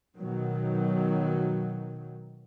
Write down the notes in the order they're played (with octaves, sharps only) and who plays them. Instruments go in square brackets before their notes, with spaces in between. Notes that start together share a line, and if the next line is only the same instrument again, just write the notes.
[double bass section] B2 D#3 F#3